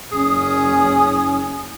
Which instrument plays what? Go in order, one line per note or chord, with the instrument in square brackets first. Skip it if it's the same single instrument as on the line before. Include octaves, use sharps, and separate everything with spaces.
[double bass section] F#1 [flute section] C#4 D#6 [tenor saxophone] G#4